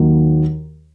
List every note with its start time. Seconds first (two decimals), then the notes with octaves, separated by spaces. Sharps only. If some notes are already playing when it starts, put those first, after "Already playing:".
Already playing: D#2 D#3 F#3